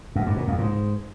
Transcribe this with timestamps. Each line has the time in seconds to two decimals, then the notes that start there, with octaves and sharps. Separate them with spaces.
0.16 F#2
0.26 G2
0.37 A#2
0.48 F2
0.58 G#2